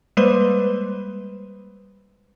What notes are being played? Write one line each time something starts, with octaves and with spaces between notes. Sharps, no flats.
G3 G#3 A#3 B4 C5